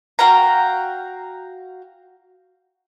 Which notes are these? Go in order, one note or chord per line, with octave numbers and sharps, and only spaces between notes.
F#4 F5 G5 A#5